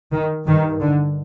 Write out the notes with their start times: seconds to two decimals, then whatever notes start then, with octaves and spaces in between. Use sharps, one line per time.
0.12 D#3
0.47 G2 D#3
0.80 D3